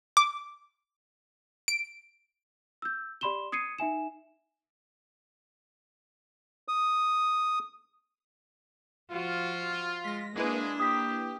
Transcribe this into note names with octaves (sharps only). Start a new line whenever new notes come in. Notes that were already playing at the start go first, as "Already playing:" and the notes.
D6
D7
E6 G6
G4 D5 B5 C6 E7 G7
D#6 G#6 C7 C#7 D#7
D#4 E5 G#5 E7
D#6
F3 F4 F#4
G#3 A#6 B6
G#3 A#3 D4 E4 B4
G4 D#6 B6